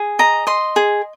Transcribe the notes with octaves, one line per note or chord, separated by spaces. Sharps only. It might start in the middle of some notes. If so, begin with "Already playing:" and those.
Already playing: G#4
D#5 A#5
D#5 C6
G#4